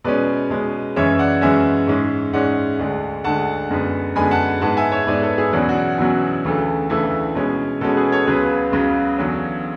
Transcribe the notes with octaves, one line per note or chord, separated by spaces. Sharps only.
B2 G#3 C#4 B4 D5
B2 G#3 C#4
F#2 E3 G#3 C#4 C#5 E5
D5 F#5
F#2 E3 G#3 C#4 E5 G#5
G#2 G#3 C#4
G#2 G#3 C#4 D5 F#5
D2 D3 G#3
D2 D3 G#3 F#5 A5
F#2 D3 G#3 B3
F#2 D3 G#3 B3 G#5 B5
F#5 A5
G#2 G#3 B3 F#5 A5
E5 G#5
C#5 E5
G#2 G#3 B3 B4 D5
A4 C#5
E4 G#4
E2 B2 F#3 C#4 D4 F#4
D4 F#4
E2 B2 F#3 C#4 E4
D2 C#3 E3 A3
D2 C#3 E3 A3 E4
B2 G#3 C#4
B2 G#3 C#4 F#4 A4
G#4 B4
A4 C#5
C#2 C#3 F#3 B3 G#4 B4
C#2 C#3 F#3 B3
E2 D3 F#3 C#4